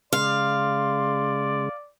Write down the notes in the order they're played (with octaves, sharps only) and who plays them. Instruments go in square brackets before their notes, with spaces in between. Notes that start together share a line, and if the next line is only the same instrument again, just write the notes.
[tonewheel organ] C#3 G#3 [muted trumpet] D5 [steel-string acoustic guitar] F5 [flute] C6